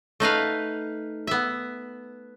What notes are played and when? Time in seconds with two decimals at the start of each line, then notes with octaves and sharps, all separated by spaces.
0.20 A3 D#4 B4 F5
1.27 B3 E5